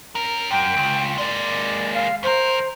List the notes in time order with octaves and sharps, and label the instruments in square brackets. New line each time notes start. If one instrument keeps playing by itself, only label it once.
[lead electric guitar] C#4 A#4
[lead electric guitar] F#2 [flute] G5
[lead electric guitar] C#2
[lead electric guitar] G#3 A#3 [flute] D5
[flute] F5
[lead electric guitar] D#2 A#4 [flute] C5